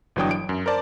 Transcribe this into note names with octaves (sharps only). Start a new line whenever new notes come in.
G1 E3 F#3 D4 G5 D#6
D7
F#2
A#4 C5 D5 A5